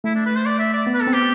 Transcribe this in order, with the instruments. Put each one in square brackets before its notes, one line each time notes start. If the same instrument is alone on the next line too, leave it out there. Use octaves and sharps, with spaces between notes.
[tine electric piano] A3 [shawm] E4
[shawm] D4
B4
C5
D5
E5
D5
[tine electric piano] B3
[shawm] B4
A4
[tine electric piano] C4
[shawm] G4